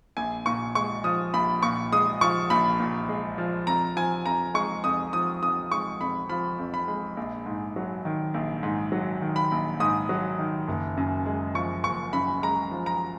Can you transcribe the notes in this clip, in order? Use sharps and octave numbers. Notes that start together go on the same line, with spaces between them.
A#1 G#5
A#2 C#6
G#3 C#6
F3 D#6
A#1 B5
A#2 C#6
G#3 D#6
F3 C#6
A#1 B5
A#2
G#3
F3
F2 A#5
F3 G#5
F2 A#5
G#3 C#6
F2 D#6
F3 D#6
F2 D#6
G#3 C#6
F2 B5
F3 B5
F2
B5
G#3
A#1
G#2
F#3
D#3
A#1
G#2
F#3
D#3
B5
A#1
G#2 D#6
F#3
D#3
F#1
F#2
G#3
F3 C#6
F#1 C#6
F#2 B5
G#3 A#5
F3
A#5